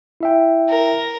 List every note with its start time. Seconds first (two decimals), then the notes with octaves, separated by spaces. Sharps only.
0.21 E4 E5 G5
0.70 A#4